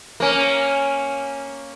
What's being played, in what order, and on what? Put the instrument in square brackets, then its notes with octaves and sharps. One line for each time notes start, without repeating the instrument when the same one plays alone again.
[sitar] A#3 C#4